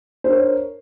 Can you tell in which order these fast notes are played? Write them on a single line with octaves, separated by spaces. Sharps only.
C5 D4 A#4 C#5